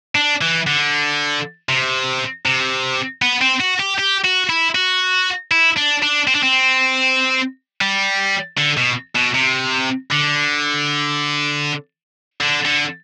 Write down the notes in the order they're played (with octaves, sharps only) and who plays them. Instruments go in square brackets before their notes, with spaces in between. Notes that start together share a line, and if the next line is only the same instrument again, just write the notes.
[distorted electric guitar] D4
E3
D3
C3
C3
B3
C4
F#4
G4
G4
F#4
E4
F#4
E4
D4
D4
C4
D4
C4
G3
D3
B2
B2
C3
D3
D3
D3